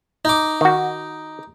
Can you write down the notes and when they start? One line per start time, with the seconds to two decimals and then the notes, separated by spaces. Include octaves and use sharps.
0.25 D#4 D6
0.61 D#3 F#4